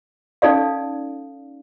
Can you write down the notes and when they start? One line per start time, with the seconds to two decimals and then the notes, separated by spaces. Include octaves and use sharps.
0.42 C#4 D#4 A4 D5 F5